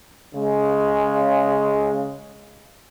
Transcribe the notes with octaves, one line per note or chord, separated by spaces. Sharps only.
C#3 G#3